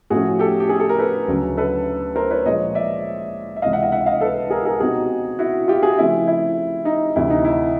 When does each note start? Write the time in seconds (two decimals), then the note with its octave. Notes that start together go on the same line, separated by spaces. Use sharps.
0.10 A2 F3 A3 C#4 F#4 G#4
0.39 G4 A4
0.60 G4
0.69 G#4
0.80 A4
0.89 A#4
0.99 A4 B4
1.28 D2 C#3 F#3 A3 C#4
1.57 A4 B4
2.16 A#4 C5
2.31 B4 C#5
2.45 A#2 F3 G#3 C#5 D#5
2.75 D5 E5
3.56 E5
3.62 C#2 C3 E3 G#3 D#5 F5
3.72 E5 F#5
3.82 D#5 F5
3.92 E5 F#5
4.06 D#5 F5
4.21 A4 B4
4.50 G#4 A#4
4.65 G#4 A#4
4.80 B2 G3 C4 D#4 F#4 G#4
5.39 E4 F#4
5.68 F4 G4
5.83 F#4 G#4
5.97 C#3 F3 A3 C4 E4
6.27 E4
6.85 D#4
7.16 D2 C3 E3 E4
7.30 D#4
7.45 E4